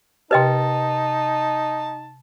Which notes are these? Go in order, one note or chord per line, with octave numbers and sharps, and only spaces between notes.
C3 D#4 G4 B4 D#5 G5 A5